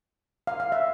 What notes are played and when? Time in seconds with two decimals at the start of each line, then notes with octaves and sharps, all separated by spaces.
0.47 F5
0.60 F5
0.72 E5